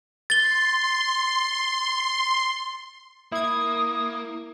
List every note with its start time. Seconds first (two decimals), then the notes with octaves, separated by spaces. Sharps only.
0.30 C6 A6 G7
3.32 A#3 E4 D#6 G#6